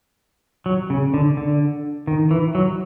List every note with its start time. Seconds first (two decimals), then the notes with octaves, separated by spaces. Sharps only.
0.66 F#3
0.90 C#3
1.14 D3
1.37 D3
2.07 D#3
2.31 E3
2.55 F#3